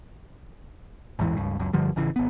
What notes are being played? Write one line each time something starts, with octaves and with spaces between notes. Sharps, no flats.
A1 E2 G#2 E3
C#2 G2
C#2 F#2
G2 D3 F3 G3
G#1 C#3 E3
G#1 B3